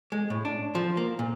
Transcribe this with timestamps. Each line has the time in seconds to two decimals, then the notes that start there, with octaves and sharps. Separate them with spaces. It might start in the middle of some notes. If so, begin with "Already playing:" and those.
0.12 G#3
0.30 A2
0.45 D4
0.75 F3
0.97 A#3
1.19 A#2